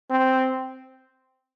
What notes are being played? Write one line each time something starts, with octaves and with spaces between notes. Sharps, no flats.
C4